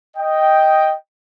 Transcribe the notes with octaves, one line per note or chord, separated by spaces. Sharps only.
D#5 G5